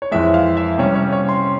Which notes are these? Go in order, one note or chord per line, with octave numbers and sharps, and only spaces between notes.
C#5
F2 E3 G#3 E5
F5
E5
C3 G3 C#4 C#5
C#5
C#5
C6